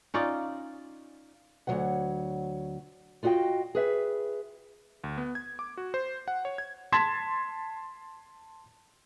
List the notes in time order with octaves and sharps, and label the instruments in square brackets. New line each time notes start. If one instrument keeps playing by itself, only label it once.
[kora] C#4 D#4 F4 D5
[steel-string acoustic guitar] D2 C3 F#3 C#5 F#5
F4 F#4 D#5 F5 G5
G#4 B4 E5
[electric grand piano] D2
B3
G#6
D6
F#4
C5
F#5
C#5
G#6
[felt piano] A5 C6 G#6 A6 B6 E7